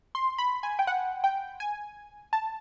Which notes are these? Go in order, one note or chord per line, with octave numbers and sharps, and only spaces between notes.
C6
B5
G#5
G5
F#5
G5
G#5
A5